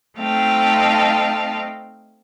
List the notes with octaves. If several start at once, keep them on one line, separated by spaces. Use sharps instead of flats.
A3 C4 D#4 F5 G5 A5